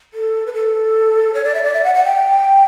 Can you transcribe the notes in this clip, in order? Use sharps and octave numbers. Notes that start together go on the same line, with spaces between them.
A4
B4
A4
C#5
D5
E5
D5
E5
F#5
F#5
G5